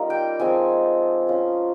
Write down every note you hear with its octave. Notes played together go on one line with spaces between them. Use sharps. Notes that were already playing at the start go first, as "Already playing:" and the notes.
Already playing: G3 A#3 C#4 D#4 F4
G5
F3 G#3 C4 F4 G#5
G#3 C#4 F4